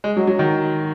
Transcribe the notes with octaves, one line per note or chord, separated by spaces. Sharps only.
G#3
F#3
F#3
D#3